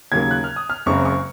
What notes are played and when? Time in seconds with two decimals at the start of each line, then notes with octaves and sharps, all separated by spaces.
0.12 D#2 C#3 F#3 A#3 G#6
0.31 F#6
0.44 F6
0.56 D#6
0.70 F6
0.86 F#1 F#2 C#3 G#3 C4 C#6
1.05 C#6